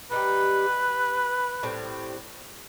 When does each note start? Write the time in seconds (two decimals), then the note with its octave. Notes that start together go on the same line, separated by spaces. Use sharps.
0.11 G3 D#4 G4 B4
1.63 A2 G3 C4